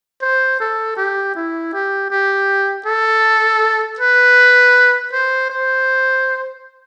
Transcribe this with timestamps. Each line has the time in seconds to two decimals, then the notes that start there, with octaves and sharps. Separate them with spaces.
0.22 C5
0.60 A4
0.97 G4
1.36 E4
1.73 G4
2.10 G4
2.86 A4
3.99 B4
5.12 C5
5.50 C5